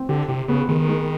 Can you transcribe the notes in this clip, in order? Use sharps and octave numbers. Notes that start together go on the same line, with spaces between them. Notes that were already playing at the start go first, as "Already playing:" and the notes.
Already playing: C4
D3 G4
C3 G4
C#3 B3
D#3 G#3
G#3